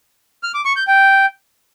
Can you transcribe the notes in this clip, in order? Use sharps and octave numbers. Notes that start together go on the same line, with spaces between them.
F6
D6
C#6
G6
G5